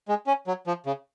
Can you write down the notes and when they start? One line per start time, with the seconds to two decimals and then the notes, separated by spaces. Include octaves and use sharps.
0.08 G#3
0.27 C#4
0.47 F#3
0.67 F3
0.86 C#3